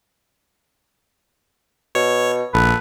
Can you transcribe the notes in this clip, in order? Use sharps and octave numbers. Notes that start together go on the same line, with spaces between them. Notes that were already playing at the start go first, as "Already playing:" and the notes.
B2 C#5
A#1 A4 B4